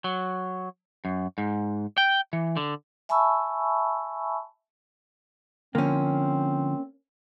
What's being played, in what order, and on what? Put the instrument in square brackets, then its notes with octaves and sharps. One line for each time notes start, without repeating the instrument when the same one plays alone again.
[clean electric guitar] F#3
F#2
G#2
G5
E3
D3
[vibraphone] E5 G#5 A5 B5 C#6 E6
[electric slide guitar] D3 F3 [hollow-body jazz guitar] A#3 C#4 [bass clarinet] C4